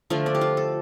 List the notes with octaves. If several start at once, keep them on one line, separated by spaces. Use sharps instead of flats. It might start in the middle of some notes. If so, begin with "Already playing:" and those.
D3 F3 A3 F4
D4
G4
F4
A4